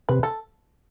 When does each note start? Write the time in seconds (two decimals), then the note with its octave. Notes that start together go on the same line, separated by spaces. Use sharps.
0.09 C3 B4
0.23 A4